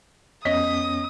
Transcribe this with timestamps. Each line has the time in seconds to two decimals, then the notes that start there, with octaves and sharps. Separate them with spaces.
0.45 F2 B3 C#4 C#5 D#5 D#6 B6